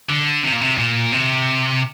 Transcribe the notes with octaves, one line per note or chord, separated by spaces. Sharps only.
D3
C3
A#2
C3
A#2
C3